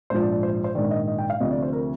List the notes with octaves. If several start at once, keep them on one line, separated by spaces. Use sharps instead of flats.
A#1 G#2 F3 C5
D5
D5
C5
C5
A#1 G#2 D#3 D5
D#5
D#5
G5
F5
D2 C3 F3 D#5
D5
C5
A#4